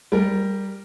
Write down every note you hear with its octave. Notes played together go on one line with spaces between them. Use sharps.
G3 A#4